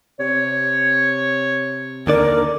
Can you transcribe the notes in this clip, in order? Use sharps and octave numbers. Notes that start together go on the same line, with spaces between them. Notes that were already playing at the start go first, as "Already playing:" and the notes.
C3 C#5
D#2 D3 A#4 D5